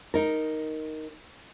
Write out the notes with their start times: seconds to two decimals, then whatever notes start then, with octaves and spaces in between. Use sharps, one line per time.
0.14 D#4 A#4